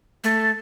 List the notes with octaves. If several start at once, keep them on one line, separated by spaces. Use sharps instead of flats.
A3